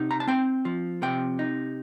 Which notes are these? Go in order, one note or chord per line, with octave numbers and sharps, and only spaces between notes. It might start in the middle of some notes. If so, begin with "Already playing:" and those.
Already playing: C3 D#4
A#5
A5
C4 G5
F3
C3 G5
D#4